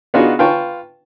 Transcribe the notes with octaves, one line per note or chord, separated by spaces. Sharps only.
B3 D4 D#4 F4 F#4 G#4
F4 B4 G5 A5 C#6